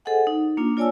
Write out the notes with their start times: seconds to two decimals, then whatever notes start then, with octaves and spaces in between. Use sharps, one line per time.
0.05 G#4 A4 C5 D#5 F#5 G#5
0.27 D#4
0.57 A#3 D4 F4
0.77 F4 C#5 D5 G#5 A5 E6